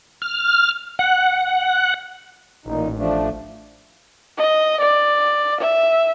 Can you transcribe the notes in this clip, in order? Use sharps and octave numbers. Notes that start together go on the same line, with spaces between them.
F6
F#5
A1 A#2 D#4
F3 A3 D4
D#5
D5
E5